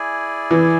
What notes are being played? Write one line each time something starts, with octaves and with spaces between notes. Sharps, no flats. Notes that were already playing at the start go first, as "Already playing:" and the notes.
Already playing: E4 G#4 D5 G#5
E3